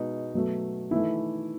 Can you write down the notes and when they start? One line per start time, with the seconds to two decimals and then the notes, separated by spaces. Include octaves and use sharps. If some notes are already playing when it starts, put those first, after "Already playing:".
Already playing: B2 G#3 D#4
0.34 B2 F#3 A3
0.91 D#3 E3 A3 E4